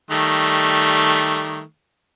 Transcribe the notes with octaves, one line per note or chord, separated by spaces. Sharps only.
D#3 G3 A3